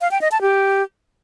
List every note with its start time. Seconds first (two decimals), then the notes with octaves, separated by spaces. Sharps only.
0.01 F5
0.11 G5
0.21 D#5
0.32 A5
0.42 G4